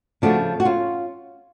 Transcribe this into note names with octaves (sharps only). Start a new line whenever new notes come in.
C#3 F3 A3 D4 F#4
F#4
C#4 F4